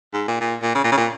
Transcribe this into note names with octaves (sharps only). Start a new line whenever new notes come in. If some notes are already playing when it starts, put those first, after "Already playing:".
G#2
A#2
A#2
A#2
C#3
A#2
C#3
A#2